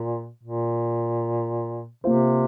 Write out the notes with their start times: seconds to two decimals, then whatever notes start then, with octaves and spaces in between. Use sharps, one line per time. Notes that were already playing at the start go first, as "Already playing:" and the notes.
Already playing: A#2
0.43 A#2
2.04 C3 A#3 F4 C5